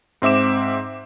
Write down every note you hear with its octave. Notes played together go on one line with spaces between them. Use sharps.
G#2 C4 E5 D6 E7